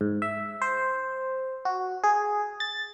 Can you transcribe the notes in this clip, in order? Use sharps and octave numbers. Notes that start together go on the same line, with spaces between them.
G#2
E5
C5
F#4
G#4
A6